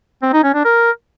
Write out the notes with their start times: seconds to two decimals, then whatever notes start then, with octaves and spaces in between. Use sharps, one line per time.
0.22 C4
0.33 D#4
0.44 C#4
0.54 D4
0.65 A#4